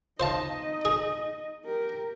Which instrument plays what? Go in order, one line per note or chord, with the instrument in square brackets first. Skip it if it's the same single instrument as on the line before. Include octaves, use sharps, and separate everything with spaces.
[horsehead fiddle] D#4 D#5 [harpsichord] C5 F5 A5
[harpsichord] G#4
[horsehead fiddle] G4 A#4